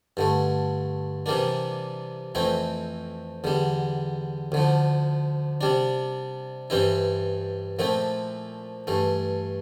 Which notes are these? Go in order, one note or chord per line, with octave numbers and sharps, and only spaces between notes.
G2 D3 A3
C3 E3 G3 A#3 D4
F2 E3 A3 C4 E4
E2 D3 G3
D2 D3 F3
C3 G3 D4
G2 E3 G3 C4 E4
A#2 F3 A3 C4 E4
G2 E3 A3